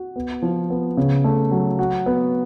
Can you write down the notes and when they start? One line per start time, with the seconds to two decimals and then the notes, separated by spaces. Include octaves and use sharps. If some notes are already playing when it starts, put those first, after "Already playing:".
Already playing: F#4
0.16 B3
0.42 F3
0.70 B3
0.97 C#3
1.24 A3
1.51 F#3
1.79 F#4
2.06 B3